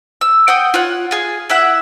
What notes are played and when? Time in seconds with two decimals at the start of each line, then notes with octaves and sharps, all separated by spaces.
0.21 E6
0.48 F#5 G5 D#6
0.74 F4 C#5 F#5
1.11 F4 G#4
1.50 E4 E5 F#5